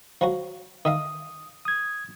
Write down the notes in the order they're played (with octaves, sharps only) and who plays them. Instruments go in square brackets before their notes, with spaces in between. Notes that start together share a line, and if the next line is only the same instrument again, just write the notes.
[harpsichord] F3 F#3 F#4
[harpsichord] D#3 E5 F5 [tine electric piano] D#6
[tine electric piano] D#6 G#6